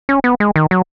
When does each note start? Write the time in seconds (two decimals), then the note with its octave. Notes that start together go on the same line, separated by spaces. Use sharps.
0.09 C#4
0.24 B3
0.40 G#3
0.56 D#3
0.71 F#3